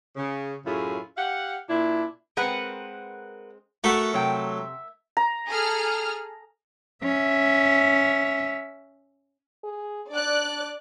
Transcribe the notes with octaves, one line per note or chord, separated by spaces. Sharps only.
C#3
F#2 A2 E4 F4 G#4
G4 F5 F#5
A#2 D4 E4
G#3 C4 A#4 B4 F#5
A3 F#4 A4 A#4 E5 F#5
C3 F#3 G5
A#5
G#4 A4 F6
C#4 E5
G#4
D4 D5 D6 F#6